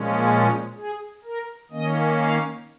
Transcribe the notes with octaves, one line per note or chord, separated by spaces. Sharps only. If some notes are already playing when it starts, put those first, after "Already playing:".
Already playing: A#2 F3 G#3 C#4
F4
G#4
A#4
D#3 A#3 C#4 D#5
F5